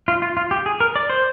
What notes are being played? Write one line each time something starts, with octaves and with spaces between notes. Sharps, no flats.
F4
F4
F4
G4
G#4
A#4
D5
C5